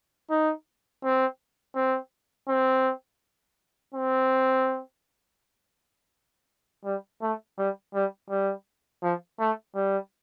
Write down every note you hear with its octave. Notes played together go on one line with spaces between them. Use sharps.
D#4
C4
C4
C4
C4
G3
A3
G3
G3
G3
F3
A3
G3